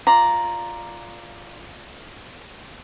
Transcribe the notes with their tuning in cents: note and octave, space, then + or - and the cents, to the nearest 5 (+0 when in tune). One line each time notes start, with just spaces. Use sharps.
F4 +0 D5 +0 A#5 +0